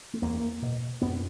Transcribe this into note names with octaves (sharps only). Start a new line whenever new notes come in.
A3
E2 A#3
B2
F#2 B3